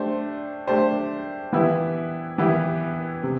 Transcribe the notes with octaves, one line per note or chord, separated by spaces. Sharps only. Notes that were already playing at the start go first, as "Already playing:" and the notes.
Already playing: A3 D4 G4 C5
A3 D4 G4 C5
E3 B3 E4 G4 B4
E3 B3 E4 G4 B4
C3